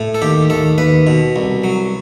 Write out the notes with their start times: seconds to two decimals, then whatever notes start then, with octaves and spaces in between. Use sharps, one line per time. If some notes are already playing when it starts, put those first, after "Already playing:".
Already playing: A2
0.15 A4
0.22 D#2 G4
0.50 D#2 A4
0.78 D#2 B4
1.07 B2
1.36 C2
1.64 F#3